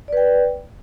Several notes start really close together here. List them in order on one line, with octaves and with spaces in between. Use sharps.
D5 B4 G5